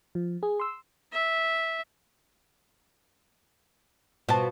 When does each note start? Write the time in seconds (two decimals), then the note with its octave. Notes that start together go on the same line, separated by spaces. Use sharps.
0.15 F3
0.43 G#4
0.60 C6 E6
1.12 E5
4.29 B2 F4 A5